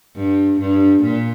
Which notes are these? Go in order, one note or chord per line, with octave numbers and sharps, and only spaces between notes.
G2
G2
A#2